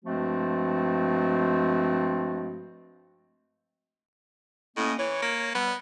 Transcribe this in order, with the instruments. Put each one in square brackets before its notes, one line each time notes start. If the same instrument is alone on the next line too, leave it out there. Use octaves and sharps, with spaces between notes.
[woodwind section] G2 F3 G#3 A3 C4 F#4
[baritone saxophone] A2 [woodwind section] A#3 C#4 D#5
[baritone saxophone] E3 [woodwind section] C#5
[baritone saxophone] A#3
[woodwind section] G3 [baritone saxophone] B3